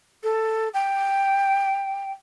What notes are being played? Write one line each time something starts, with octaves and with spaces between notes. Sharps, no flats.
A4
G5